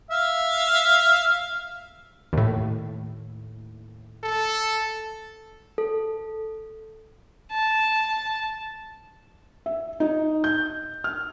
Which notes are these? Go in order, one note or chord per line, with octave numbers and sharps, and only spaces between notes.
E5 F5
D#2 A2
A4
A4
A5
E5
D#4
G6
F6